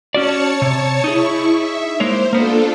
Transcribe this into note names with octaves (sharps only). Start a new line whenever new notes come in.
C#4 F#4 C#5 D5 A5 C#7
C3
D#4 E4 G#4 C#6
E5
G#3 A#3 C5 C#5
A#3 B3 D4 F4 A4